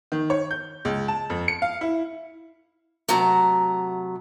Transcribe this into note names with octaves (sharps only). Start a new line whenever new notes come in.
D#3
C#5
G6
C#2
A5
F2
C#7
F5
E4
C3 F#3 A3 A#5